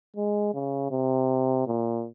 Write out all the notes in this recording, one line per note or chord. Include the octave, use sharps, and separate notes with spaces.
G#3
C#3
C3
A#2